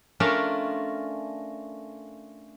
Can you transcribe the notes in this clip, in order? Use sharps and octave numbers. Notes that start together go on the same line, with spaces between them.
A3 C#4 D4 F4 A#4 D5